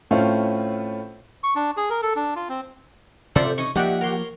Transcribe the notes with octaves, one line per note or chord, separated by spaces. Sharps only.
A2 A3 C4 C#4 F4
C#6
D4
G#4
A#4
A4
D4
F4
C4
C3 F4 A4 C5 D5 E5 F#5
C#4 D#4 G#5 C#6
F3 A#3 D#4 G4 D5 E5 F#5
A#4 C#5 C6